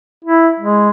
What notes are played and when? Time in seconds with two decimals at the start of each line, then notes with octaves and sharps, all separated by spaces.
0.24 E4
0.60 G#3